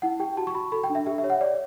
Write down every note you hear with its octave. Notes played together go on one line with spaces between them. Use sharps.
E4 F#5
G4 G5
F#4 A5
C#6
F#4 B5
A4 B5
G5
D4
E5
G4 E5
E5
C#5
F#5
C#5 D5